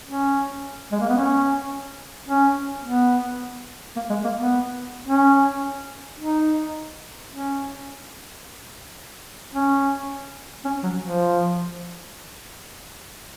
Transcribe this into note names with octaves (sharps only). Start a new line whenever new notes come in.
C#4
G#3
A#3
B3
C#4
C#4
B3
A#3
G#3
A#3
B3
C#4
D#4
C#4
C#4
C#4
F#3
F3